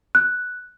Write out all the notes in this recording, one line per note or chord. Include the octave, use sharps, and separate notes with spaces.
F#6